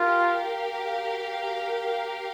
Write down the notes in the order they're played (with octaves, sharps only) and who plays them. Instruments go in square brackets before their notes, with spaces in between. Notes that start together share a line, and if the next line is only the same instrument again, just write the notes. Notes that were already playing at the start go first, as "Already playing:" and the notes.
Already playing: [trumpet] F4 [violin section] G4 A#4 F5